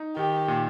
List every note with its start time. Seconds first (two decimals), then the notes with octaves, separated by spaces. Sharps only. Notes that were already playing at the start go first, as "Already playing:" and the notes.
Already playing: D#4
0.16 D#3 G4
0.48 A#2